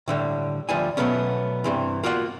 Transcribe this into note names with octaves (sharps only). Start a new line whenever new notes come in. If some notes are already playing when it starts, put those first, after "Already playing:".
A2 D3 G3
D2 F3 G3 G#5
B2 D3 F#3 A3 B3 C#4
G2 C3 E3
A#3 F4 F#4 E5 F#5